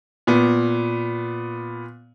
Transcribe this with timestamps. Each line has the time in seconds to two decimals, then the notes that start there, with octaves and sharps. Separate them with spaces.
0.27 A#2 B3